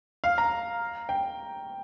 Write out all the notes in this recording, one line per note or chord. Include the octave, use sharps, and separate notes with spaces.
F5
A#5
G5